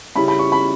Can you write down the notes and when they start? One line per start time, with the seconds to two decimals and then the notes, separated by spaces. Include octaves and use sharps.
0.16 C#3 G3 C#4 E4 B5
0.28 B5
0.39 C#6
0.52 B5